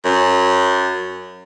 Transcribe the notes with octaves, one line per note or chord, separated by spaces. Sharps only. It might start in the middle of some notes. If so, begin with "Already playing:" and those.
F#2